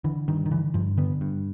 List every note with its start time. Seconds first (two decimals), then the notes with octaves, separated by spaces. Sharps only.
0.04 D3 E3
0.28 G2 D#3
0.46 D#3
0.51 D3 E3
0.74 G2 F3
0.97 D3 B3
1.21 G2